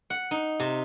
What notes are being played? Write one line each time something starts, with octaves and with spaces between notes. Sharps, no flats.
F#5
D#4
C3